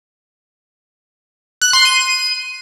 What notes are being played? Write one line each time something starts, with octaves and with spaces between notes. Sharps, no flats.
F#6
C6
D#7